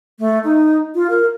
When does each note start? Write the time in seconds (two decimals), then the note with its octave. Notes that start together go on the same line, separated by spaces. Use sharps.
0.19 A3
0.44 D#4
0.95 F4
1.10 A#4